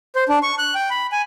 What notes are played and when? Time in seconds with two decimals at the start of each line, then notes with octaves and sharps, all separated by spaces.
0.16 C5
0.29 D4
0.43 C#6
0.58 F#6
0.75 G5
0.90 B5
1.12 G#5